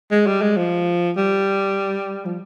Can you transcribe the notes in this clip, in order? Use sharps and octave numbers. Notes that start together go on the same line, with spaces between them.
G#3
G3
G#3
F3
G3
F3